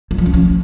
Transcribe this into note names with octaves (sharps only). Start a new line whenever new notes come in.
G3
F3
C#4
F3